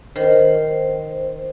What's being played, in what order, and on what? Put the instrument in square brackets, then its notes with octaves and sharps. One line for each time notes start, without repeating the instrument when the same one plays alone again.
[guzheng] D#3 [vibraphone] C5